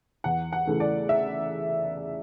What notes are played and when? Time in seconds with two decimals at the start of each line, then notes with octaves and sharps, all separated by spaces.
0.24 E2 F#5
0.53 F#5
0.67 C#3 E3 A3
0.80 D5
1.09 E5